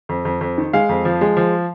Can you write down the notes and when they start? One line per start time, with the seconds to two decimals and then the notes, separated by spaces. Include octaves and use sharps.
0.09 F2
0.25 F2
0.41 F2
0.58 D#3
0.73 G#3 F5
0.89 F2
1.05 F3
1.21 G#3
1.37 F3